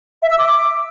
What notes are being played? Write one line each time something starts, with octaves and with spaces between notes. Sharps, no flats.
E5
E6
D6